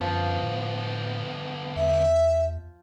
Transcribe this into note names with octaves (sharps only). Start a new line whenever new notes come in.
F#2 D3 F3 B3
A2
E2 E5